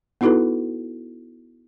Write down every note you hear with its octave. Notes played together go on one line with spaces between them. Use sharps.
B3 D#4 E4 F#4 A4 B4